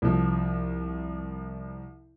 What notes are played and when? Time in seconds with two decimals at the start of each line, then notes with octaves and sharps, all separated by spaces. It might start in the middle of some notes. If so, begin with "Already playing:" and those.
0.02 C2 F3